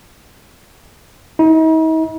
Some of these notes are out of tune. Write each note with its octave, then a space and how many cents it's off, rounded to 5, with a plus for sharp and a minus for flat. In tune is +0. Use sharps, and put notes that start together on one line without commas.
D#4 +45